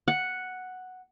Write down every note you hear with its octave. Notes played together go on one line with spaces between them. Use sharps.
F#5